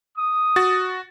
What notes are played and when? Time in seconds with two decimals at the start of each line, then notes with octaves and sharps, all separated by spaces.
0.16 D#6
0.56 F#4 A6